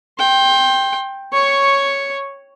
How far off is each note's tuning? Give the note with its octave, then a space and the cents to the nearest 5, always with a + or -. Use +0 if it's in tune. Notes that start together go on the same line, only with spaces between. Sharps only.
G5 +5 C6 +30
C#5 +0 C#6 +0